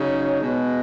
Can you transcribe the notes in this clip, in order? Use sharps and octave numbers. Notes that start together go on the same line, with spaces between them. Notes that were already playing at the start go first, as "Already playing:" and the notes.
Already playing: C#3 F#3 D#4
B2 G#3 B3